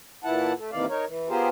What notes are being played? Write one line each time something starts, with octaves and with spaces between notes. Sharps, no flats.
A#2 E3 E4 F#5 A5
A3
D#2 C3 D#3 E3 D5 F5
D#4 A#4 C#5
E3
B3 F4 G4 G#4 A#4 C5